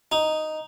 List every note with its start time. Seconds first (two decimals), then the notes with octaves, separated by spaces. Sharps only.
0.12 D#4